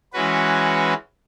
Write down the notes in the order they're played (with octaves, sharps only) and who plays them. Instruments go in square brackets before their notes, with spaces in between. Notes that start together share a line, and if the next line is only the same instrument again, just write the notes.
[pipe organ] E3 G#3 C#4 F#4 B4